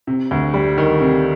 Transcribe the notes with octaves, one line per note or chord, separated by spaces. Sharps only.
C3
D2
G3
D#3
C3